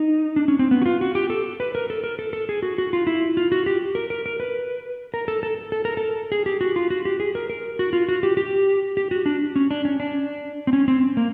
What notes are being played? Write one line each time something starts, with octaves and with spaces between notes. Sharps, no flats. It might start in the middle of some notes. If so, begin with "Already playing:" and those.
Already playing: D#4
D4
C#4
C4
B3
F#4
F4
F#4
G4
A4
B4
A#4
A4
A#4
A4
A4
G#4
F#4
F#4
F4
E4
F4
F#4
G4
A#4
A#4
A#4
B4
A#4
A4
A4
A4
A#4
A4
G#4
G4
F#4
F4
F#4
G4
G#4
A#4
A#4
F#4
F4
F#4
G4
G4
G4
F#4
D4
C#4
D4
C#4
D4
C4
C#4
C4
A#3